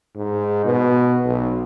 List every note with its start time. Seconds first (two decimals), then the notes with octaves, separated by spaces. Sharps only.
0.15 G#2
0.65 B2
1.26 B1